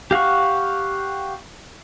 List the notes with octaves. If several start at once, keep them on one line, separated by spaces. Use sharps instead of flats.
G4 F5 F#5 C#6